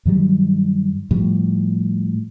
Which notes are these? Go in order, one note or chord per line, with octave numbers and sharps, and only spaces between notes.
G2 D#3 F#3 G3
A2 F3 G3